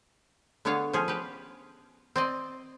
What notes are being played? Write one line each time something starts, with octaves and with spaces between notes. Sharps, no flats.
D3 B3 G#4 C#5 F5
F3 C#4 G#4
G4 B4
C4 D5 D#5